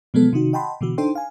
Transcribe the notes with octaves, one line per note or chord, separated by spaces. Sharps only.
B2 F3 F#3 G#3 B3 A4
C3 D#3 D#4 F#4
D#5 F#5 G5 A5 B5 C6
B2 D3 E3 F#4
D4 D#4 A4 C5 G5 C6
F5 G#5